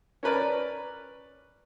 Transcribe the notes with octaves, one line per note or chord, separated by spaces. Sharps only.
C#4 A#4 B4 D5